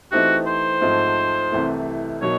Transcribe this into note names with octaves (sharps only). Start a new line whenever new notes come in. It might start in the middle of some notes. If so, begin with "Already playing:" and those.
E3 A3 C4 D#4 F#4 G4
C5
G#2 F3 A3 C4
C2 C3 E3 A3
B2 F#3 A#3 D#4 C#5